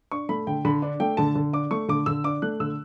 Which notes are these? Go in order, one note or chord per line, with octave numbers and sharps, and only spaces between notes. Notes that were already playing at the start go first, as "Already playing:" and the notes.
D4 C#6
A3 B5
D3 G5
D3 B5
D4
A3 G5
D3 A5
D3
D4 D6
A3 C#6
D3 D6
D3 E6
D4 D6
A3 F#6
D3 E6